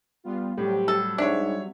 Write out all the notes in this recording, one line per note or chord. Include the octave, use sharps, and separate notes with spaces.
G3 B3 F4
A2 F#3 G3 C4 G4
A4
G#2 D4 C#5 E5